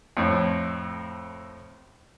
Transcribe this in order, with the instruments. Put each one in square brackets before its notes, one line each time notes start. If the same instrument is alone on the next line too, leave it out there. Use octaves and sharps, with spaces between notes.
[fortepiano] F2 A2